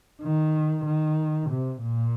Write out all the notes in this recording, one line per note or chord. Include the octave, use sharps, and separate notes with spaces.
D#3
D#3
C3
A#2